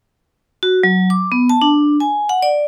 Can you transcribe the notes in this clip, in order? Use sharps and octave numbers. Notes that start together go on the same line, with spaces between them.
F#4
F#3
D6
B3
A5
D4
G#5
F#5
D5